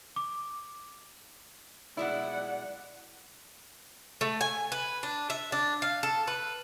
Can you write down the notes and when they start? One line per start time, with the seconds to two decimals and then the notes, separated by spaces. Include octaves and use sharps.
0.16 D6
1.97 B2 G#3 E4 D5 F#5
4.21 A3
4.41 G#5
4.72 B4
5.03 D4
5.30 E5
5.52 D4
5.82 F5
6.03 A4
6.27 B4